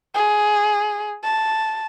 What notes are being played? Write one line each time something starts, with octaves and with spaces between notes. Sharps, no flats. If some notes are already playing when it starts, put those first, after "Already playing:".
G#4
A5